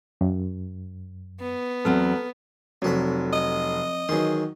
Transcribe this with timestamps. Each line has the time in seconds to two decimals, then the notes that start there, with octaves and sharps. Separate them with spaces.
0.21 F#2
1.40 B3
1.85 E2 F#3 C4 A4 F6
2.82 F1 F2 F#3 F#5 B5
3.33 D#5
4.09 D#3 E3 F#3 G#4 C6